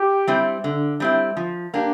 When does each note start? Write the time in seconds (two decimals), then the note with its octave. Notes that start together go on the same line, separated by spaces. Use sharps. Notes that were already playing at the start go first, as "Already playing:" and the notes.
Already playing: G4
0.28 G3 C4 E4
0.64 D3
1.00 G3 C4 E4
1.37 F3
1.74 A#3 D4 G4